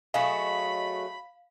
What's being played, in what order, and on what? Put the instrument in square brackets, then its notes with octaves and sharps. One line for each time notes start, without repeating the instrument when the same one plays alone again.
[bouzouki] F#3 A3 G#4 [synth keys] D#5 C#6 [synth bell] F5 [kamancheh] B5